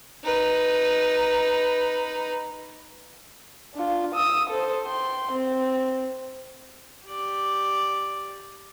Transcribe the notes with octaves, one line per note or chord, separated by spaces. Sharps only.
D#4 B4
D4 F4
D#6 E6
A4 C5
G5 C6
C4
G4 D5